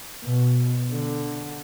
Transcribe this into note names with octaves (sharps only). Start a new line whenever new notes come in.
B2
D3